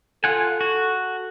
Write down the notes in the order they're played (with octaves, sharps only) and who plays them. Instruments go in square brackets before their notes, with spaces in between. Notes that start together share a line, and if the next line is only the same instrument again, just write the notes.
[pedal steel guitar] F4 F#5 G#5 [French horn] A4
[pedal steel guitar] F#4